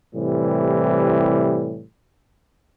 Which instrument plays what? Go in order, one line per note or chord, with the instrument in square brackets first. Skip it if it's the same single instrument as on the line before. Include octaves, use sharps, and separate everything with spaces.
[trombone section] A2 C3 E3 G3